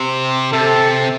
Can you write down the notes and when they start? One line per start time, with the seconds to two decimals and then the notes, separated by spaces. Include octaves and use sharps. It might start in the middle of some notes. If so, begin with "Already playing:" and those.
Already playing: C3
0.53 C3 A4